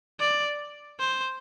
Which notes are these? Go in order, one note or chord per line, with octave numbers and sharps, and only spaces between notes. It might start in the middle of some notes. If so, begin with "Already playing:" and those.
D5
C5